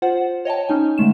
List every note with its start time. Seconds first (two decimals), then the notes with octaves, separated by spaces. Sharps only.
0.02 F4 C5 F#5
0.45 C#5 D#5 G5 A5
0.69 C#4 D#4 G#5
0.98 D3 G#3 A3 E7